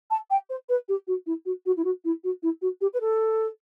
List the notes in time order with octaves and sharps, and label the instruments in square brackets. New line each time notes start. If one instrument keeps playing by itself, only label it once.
[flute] A5
G5
C5
B4
G4
F#4
E4
F#4
F#4
E4
F#4
E4
F#4
E4
F#4
G4
B4
A4